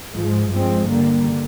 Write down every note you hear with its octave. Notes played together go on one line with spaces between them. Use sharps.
G#2 F3 G#3
G2 F3 G#3 C4
D3 G3 A#3